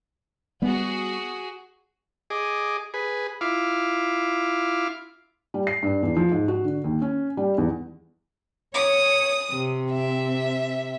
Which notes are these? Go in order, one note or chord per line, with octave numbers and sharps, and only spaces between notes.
G3 B3 F#4 G#4
G#4 D#5 D6
G#4 B4
E4 F4 F5 D6
G3
C7
G2
E2
F3
G#2
F#4
D3
D#2
C#4
G3
E2
C#5 D#6
C3 C4
E5